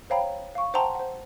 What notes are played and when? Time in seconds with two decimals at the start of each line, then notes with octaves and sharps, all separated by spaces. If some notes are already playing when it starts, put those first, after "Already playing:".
0.10 C5 C#5 F5 G5 A#5 B5
0.55 F5 C#6
0.74 C5 F#5 G5 A5 A#5 C6
0.95 C5 F#5